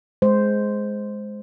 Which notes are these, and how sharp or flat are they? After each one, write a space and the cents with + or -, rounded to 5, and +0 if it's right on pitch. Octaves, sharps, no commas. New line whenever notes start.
G#3 +10 C5 -5